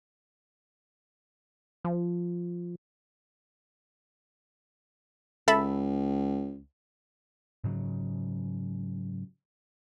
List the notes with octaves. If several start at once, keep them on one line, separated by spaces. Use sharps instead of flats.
F3
C#2 A4 E5 B5
G#2 C#3 F#3